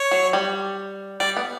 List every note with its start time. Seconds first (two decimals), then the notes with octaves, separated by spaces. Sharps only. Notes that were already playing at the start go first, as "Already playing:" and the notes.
Already playing: C#5
0.11 F#3
0.33 G3
1.20 G3 D5
1.37 B3